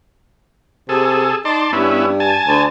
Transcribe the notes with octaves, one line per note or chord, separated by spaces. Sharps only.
C3 G#4 A4
D#4 D5 A5 C6
G2 B3 C#4 E4
G#5 A5
D2